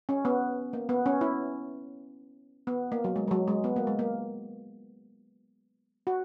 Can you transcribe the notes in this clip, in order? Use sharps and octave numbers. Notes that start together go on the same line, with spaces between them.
C#4
B3
A#3
B3
C#4
E4
B3
A#3
F#3
G#3
G#3
F#3
G#3
B3
A#3
G#3
A#3
F#4